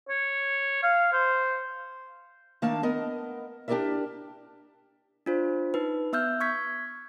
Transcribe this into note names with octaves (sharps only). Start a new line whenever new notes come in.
C#5
F5
C5
D#3 A3 A#3 D4 F5 A5
B3 A#4 D#5
D4 G4 G#4 A#4 D5 E5
D4 F4 C5
D#4 B4
B3 E5 E6 F6 G6
C#6 G#6 B6